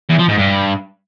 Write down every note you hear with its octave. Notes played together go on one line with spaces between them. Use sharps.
E2
F3
G#2
G2